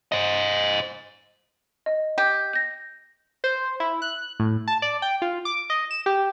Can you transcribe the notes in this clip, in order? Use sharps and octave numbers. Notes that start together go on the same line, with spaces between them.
C5 D#5
D#5
G4
G6 A#6
C5
E4
F#6
A2
A5
D5
G5
F4
D6
D#5
E7
G4